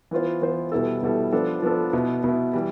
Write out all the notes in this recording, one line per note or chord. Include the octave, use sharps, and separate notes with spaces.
E3 B3 F4 C5
E3 B3 F4 C5
B2 G3 B3 E4 A4
B2 G3 B3 E4 A4
F3 B3 D4 A4
F3 B3 D4 A4
B2 B3 E4
B2 B3 E4
E3 G3